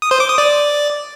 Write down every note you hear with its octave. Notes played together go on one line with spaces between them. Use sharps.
D#6
C5
D6
D#6
D5